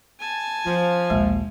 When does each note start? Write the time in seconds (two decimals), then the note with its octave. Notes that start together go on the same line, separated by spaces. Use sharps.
0.20 G#5 A5
0.66 F3 C#4
1.10 A#1 D#2 G#3